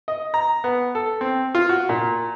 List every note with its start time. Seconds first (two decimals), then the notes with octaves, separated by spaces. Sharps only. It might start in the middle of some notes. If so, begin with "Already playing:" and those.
0.08 D#5
0.34 A#5
0.64 B3
0.95 A4
1.21 C4
1.55 F4
1.69 F#4
1.89 A#2